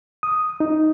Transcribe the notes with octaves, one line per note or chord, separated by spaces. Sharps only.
D#6
D#4